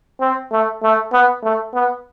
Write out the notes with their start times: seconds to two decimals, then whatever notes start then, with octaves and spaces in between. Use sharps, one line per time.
0.21 C4
0.52 A3
0.83 A3
1.13 B3
1.44 A3
1.75 B3